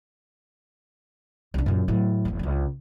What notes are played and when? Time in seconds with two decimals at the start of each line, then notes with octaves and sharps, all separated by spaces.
1.54 C2 D4
1.66 F#2 A#2
1.88 A2 F#3
2.25 F#1 E2
2.39 C#2 D4